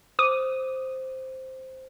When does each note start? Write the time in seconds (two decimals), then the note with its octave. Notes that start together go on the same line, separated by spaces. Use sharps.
0.19 C5 D6 D#6 D#7